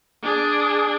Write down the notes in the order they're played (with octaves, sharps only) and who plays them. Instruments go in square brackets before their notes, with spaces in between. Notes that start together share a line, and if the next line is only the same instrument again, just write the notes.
[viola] D4 G#4